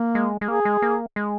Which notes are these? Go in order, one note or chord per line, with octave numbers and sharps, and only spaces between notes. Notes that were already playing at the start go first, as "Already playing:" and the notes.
Already playing: A#3
G#3
G#3
A#3 G#4
G#3
A#3
G#3